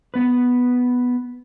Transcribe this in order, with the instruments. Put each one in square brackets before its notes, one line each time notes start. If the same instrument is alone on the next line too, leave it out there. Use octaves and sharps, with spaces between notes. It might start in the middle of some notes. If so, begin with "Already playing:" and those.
[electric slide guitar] B3 B4